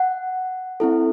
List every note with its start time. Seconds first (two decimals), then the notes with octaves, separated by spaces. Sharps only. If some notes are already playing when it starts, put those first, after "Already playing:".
Already playing: F#5
0.80 C4 E4 A4